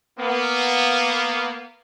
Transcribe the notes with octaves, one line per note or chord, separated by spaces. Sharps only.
A#3 B3